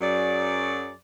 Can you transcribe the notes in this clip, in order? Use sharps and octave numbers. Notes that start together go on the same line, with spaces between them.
F#2 F#3 G#4 D5